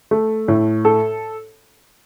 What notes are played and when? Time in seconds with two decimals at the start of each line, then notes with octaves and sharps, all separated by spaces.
0.11 A3
0.48 A2
0.85 A4